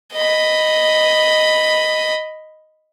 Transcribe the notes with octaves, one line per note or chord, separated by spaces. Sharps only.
D#5 B5